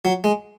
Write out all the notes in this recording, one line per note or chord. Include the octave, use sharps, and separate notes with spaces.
F#3
G#3